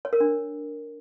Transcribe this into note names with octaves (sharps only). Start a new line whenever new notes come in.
C#5
A#4
D4